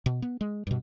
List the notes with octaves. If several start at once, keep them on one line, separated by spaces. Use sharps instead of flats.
B2
B3
G#3
G2 B2